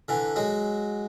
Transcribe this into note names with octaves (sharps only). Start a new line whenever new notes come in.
D3 E3
F#3 G#3